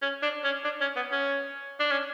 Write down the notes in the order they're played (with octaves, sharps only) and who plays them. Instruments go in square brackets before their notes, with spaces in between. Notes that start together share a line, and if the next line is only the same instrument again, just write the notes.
[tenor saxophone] C#4
D4
C#4
D4
C#4
B3
C#4
D4
C#4